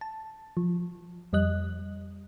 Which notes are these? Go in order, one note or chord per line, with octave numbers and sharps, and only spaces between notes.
A5
F3
F2 G3 D#5 F#6